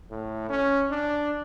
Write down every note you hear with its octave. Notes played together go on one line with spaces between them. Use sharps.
A2
C#4
D4